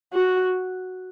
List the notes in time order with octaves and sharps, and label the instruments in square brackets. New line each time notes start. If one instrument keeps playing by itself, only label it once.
[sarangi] F#4